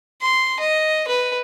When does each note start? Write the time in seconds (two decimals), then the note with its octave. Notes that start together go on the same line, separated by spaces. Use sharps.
0.22 C6
0.60 D#5
1.08 B4